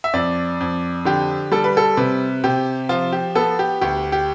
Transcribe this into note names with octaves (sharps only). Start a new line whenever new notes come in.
E5
F2 D5
F2
D3 G4
G3 A4
B4
A4
C3 B4
C3 G4
F3 F4
G4
B3 A4
G4
D2 G4
G4